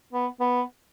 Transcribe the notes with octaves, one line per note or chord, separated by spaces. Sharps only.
B3
B3